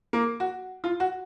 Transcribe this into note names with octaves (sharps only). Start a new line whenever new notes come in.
A#3
F#4
F4
F#4